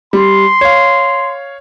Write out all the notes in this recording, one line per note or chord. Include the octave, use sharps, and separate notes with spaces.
G3 C6
C#5 F5